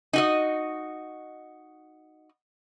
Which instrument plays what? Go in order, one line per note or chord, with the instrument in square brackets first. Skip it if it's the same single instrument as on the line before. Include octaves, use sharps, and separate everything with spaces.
[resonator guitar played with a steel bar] D#4 F#4 D#5